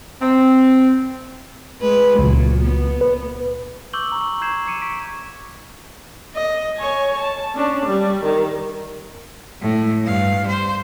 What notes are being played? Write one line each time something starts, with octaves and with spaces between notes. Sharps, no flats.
C4
G#3 B4
C#2 A#2 F#3
B3
B4
C#6 D6 E6 G6 F#7 G7
A#5 C#6
C#6 G6 G#6 C7 E7
D6 G#6 C#7 D#7 E7
C#6 B6 D7
D#5
C#5 G#5
A5
C#4 D4
G3
D#3
A2
G2 F5
C5